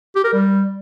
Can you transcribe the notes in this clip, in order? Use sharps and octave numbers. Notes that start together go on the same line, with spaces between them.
G4
A#4
G3